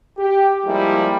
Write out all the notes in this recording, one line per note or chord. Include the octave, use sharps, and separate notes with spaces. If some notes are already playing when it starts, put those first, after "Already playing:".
G4
F3 G3 G#3 A#3 E4 G4